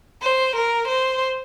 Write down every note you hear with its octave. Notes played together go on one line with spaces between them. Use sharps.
C5
A#4
C5